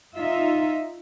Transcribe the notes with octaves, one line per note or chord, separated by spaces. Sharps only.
D#4 F4 E5